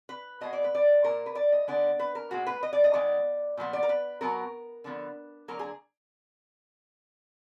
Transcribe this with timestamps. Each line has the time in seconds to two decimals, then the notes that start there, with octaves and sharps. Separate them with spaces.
0.09 B4
0.41 B2 G#3 B3 D#5
0.53 D5
0.64 B4
0.75 D5
1.04 A#2 F3 A#3 A#4
1.26 B4
1.35 D5
1.52 D#5
1.67 D3 G#3 B3 D5
1.99 B4
2.15 A#4
2.30 A#2 G#3 B3 F#4
2.47 B4
2.63 D#5
2.73 D5
2.84 D#5
2.94 D#3 G#3 B3 D5
3.57 A#2 F3 B3
3.73 D5
3.83 A#4
3.89 B4
4.21 B2 F#3 B3 A#4
4.84 D3 F3 B3
5.48 D3 F#3 A#3 A#4
5.59 G#4